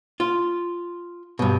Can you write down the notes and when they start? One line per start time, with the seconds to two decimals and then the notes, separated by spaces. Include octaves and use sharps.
0.20 F4
1.39 G2 B2